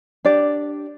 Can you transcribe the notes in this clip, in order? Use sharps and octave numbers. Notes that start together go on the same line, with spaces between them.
D4 G4 D5